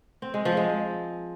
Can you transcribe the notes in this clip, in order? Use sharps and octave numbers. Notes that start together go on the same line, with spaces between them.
C4
G#3
F3
G#3